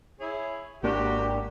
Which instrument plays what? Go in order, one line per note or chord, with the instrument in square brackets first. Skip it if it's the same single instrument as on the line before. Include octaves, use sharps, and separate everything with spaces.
[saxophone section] E4 G#4 C#5
[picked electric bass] G#1 A#3 D4 [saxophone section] F#4 G4